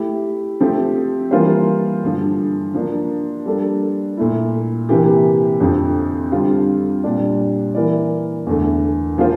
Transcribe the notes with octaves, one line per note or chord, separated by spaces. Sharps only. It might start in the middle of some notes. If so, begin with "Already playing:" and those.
Already playing: A3 E4 G4
F3 A3 C4 G4
E3 G3 A#3 F4 C5
G2 D3 F3
F3 A#3 D4
G3 A#3 D4 A4
A#2 A3 E4
C3 E3 A#3 E4 G4
F2 D3 F3 C4
D3 G3 C4 F4
A#2 G3 D4 G4 D5
E3 A#3 E4 A#4 D5
E2 D3 A3
F3 A#3 F4 C5